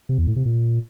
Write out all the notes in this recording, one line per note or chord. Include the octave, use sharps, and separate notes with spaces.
C3
E2
A2
C3
A#2